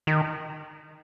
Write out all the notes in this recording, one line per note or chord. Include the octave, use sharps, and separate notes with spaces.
D#3